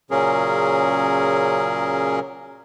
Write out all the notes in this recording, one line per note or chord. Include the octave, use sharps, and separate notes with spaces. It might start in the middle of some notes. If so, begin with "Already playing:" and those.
A#2 C#3 F#3 C#4 G#4 A#4